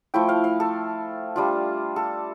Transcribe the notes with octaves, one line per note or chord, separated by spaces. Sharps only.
F3 A3 E4 G5
F5
F5
A4
G3 D4 F4
A4